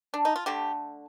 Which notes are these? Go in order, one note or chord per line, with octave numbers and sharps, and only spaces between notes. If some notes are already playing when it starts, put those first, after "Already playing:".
D4
D#4
F4
D3 A3 G4